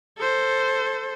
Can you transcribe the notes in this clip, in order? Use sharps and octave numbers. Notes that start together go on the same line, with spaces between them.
A4 C5